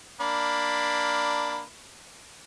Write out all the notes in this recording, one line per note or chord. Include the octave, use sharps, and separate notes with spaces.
A#3 D4 B5